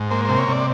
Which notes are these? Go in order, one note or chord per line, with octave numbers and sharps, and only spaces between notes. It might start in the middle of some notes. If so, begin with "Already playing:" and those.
Already playing: G#2
A#3 C5
C3 C5
C#5
C3 D5